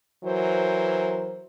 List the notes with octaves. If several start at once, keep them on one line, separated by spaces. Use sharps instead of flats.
E3 F#3 A#4 C5